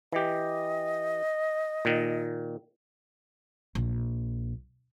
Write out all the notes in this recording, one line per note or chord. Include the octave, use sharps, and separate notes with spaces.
E3 G4 D#5
A#2 D#3
A#1